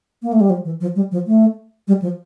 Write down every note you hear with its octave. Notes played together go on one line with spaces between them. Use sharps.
A#3
A3
G3
F3
E3
F3
G3
F3
A3
G3
F3